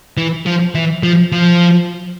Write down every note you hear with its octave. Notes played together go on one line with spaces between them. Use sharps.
E3
F3
E3
F3
F3